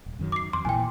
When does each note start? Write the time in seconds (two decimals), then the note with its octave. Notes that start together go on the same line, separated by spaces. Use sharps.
0.06 D#1
0.19 F#2 D#3 F#3
0.32 D6 C7
0.53 F2 C6
0.65 A#1 A#2 E3 G5 G#5